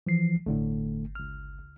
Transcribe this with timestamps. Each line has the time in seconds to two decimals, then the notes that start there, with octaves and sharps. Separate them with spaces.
0.07 E3 F3 C7
0.46 G1 A2 D3 A3
1.15 C#2 F6